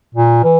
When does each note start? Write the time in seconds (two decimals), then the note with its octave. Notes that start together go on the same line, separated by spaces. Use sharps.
0.15 A#2
0.44 E3